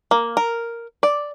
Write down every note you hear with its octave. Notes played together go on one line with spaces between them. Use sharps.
A#3
A#4
D5